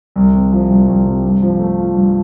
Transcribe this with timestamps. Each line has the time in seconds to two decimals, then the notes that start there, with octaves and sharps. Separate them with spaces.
0.16 C2
0.34 C3
0.52 F3
0.70 C2
0.88 C2
1.06 C3
1.23 G2
1.42 F3
1.59 A3
1.78 F4
1.95 G2